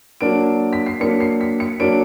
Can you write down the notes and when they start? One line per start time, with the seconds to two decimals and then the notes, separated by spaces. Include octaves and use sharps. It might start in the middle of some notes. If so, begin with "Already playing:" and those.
0.21 F#3 A#3 D4 D7
0.73 B6
0.86 C7
1.00 F#3 A#3 D4 C#7
1.20 C7
1.41 B6
1.60 C#7
1.80 F#3 A#3 D4 D7